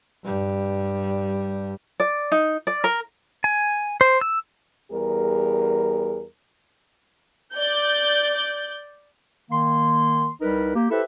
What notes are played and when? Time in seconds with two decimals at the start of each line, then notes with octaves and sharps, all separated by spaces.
0.25 G2 G3
2.00 D5
2.32 D#4
2.67 D5
2.84 A#4
3.44 G#5
4.01 C5
4.21 E6
4.92 E2 G3 G#4 A#4
7.54 D5 G6
9.51 D#3 A#3 C6
10.41 C2 G3 D#4 A#4 B4
10.75 A#3 G4
10.91 E4 G4 A4 B4 C5 E5